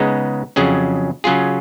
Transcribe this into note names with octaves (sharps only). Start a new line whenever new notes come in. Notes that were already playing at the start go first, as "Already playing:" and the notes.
Already playing: C#3 G#3 B3 D#4
F2 C#3 F#3 C#4 G#4
C#3 F#3 C#4 F4 G#4